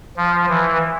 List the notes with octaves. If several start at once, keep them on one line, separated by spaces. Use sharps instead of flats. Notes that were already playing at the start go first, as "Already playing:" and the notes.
F3
E3